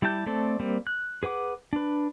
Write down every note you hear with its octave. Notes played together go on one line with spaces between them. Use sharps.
G3 E4 G4 A5 G6
A3 C4 A4 D5
G3 A#3 C4
F#6
G#4 B4 F#5 D6
D4 B4